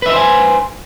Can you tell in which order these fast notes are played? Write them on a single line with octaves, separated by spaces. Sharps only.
B4 E5 D#5 C5 G#5